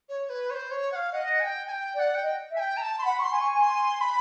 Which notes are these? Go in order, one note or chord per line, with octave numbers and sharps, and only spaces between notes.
C#5
B4
C#5
C5
C#5
F#5
F5
D#5 F#5
G#5
G5
G#5
G5
D5 G5
F#5
G5
D#5
E5
G#5
G5
A#5
A5
C6
F#5 B5
C#6
C6
G#5
C#6
C6
B5